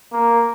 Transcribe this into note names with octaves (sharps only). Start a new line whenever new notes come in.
A#3